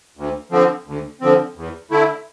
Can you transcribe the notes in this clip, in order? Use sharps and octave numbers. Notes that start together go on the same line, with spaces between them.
D2
D3 F3 C4
D2
D3 F3 C4
E2
D3 A3 E4